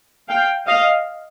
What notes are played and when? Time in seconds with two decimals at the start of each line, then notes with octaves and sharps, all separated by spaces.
0.29 F5 G5
0.67 D#5 F5